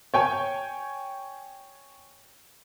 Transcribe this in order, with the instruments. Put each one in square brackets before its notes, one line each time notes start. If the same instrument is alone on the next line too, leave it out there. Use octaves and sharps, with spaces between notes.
[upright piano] C#5 G5 G#5